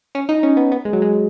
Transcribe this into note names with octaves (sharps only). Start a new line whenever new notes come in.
C#4
D#4
C#4
B3
B3
G#3
F#3
G#3